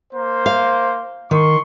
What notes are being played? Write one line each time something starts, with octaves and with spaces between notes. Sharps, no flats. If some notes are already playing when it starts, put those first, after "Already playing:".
A#3 C5
F5
D#3 C6 C#6